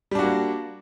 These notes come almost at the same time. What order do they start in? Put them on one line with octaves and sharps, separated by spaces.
G3 D4 F#4 A#3